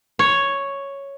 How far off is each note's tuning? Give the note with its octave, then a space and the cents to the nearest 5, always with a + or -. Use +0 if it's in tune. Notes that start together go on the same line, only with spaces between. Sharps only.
C#5 +0